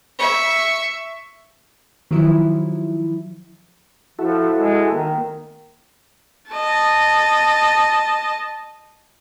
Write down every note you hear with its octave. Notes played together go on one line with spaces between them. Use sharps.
E5 C#6
D#3 F3 F#3 E4
F3 E4 F#4 A4
G#3
D#3 A#3
D#5 A5